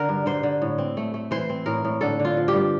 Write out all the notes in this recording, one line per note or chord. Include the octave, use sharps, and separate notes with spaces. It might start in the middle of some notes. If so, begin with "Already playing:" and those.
Already playing: D3 A#4
G2
D3 C5
D3
A2
C4
A3
A3
E3 C5
C4
A2 A#4
A2
D3 A4
D3
F4
F3
G4
G2